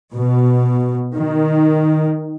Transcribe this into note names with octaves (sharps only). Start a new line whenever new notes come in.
B2
D#3